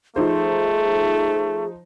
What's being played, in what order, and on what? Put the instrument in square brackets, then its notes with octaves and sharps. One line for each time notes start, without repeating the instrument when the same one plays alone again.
[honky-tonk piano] F3 D#4 C5 [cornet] A3 [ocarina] G#4